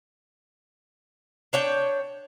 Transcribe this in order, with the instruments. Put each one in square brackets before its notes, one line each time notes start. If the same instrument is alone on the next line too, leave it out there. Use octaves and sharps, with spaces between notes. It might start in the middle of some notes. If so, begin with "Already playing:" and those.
[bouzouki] D4 C#5 G5